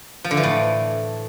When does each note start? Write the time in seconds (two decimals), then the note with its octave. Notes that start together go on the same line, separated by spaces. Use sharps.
0.24 F3
0.31 D3
0.37 E3
0.43 A2